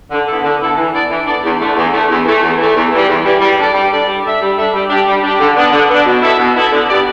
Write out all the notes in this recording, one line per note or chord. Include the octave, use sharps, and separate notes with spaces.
D3
B3 E4 A4
D3
B3 E4 A4
E3
B3 D4 A4 D5
E3
B3 D4 A4 D5
E2
D3 A3
E2
D3 A3
E2
E3 A3
E2
E3 A3
E2
E3 G3
E2
E3 G3
G3
D4 A4 D5
G3
D4 A4 D5
G3
D4 A4 E5
G3
D4 A4 E5
G3
D4 G4
G3
D4 G4
D3
B3 D4
D3
B3 D4
B2
B3 E4 A4 E5
B2
B3 E4 A4 E5
D3
B3 G4 B4 D5